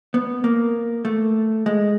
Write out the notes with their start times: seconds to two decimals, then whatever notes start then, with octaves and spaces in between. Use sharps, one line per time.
0.14 B3
0.44 A#3
1.05 A3
1.66 G#3